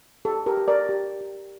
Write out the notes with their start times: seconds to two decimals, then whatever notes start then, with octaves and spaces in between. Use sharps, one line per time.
0.25 G4 A4
0.46 G4 A#4
0.57 G4
0.68 A#4 D5
0.89 G4
1.21 G4